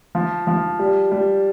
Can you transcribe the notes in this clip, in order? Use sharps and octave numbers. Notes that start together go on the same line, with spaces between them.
F3
F3
G3
G3